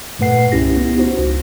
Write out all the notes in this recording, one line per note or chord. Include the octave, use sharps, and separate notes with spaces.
G2 A#2 A3 B4 F#5 C7
C2 C#4 E4 G4 A#6
B3
D#4 F#4 C5
C#2